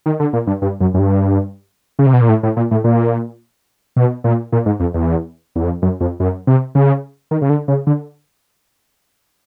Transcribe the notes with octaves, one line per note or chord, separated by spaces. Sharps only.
D#3
D3
A#2
G2
G2
F#2
F#2
G2
C#3
C3
B2
A#2
A2
A2
A#2
A2
A#2
B2
A#2
A#2
G#2
F2
E2
E2
F2
F#2
F2
F#2
C3
C#3
D#3
C#3
D3
C#3
D3